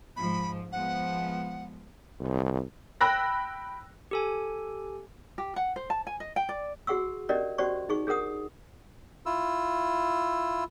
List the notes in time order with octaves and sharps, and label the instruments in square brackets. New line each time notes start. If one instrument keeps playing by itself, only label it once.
[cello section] G#2 F3 [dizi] B5
[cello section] F3 G#3 B3 [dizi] F#5
[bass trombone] C2
[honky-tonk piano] G5 B5 E6 F#6 A#6
[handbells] G4 A4 G#5
[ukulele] G4
F#5
C5
A5
G#5
D#5
G5
D5
[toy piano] F#4 G#4 F#5 C#6 E6
C#4 D4 G4 A#4 D5 D#5
C#4 F#4 G4 C5 D5 C#6
D#4 G#4 C#6
D4 G#4 A#4 F#5 D#6
[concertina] E4 F4 E6